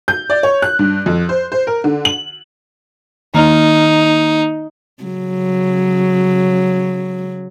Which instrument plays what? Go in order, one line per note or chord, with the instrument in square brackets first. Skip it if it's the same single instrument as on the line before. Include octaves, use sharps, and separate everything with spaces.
[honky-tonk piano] G6
D5
C#5
F#6
G2
F2
C5
C5
A#4
D3
F#7
[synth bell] D#3 A#3 [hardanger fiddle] D#4
[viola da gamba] C#3 F#3